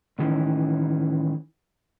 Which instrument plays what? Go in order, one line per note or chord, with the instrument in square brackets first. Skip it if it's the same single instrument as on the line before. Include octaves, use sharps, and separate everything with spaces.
[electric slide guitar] A2 D#3 E3 C#4